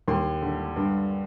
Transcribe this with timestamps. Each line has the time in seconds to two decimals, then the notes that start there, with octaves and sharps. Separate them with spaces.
0.08 D#2 C6
0.42 D3
0.76 G2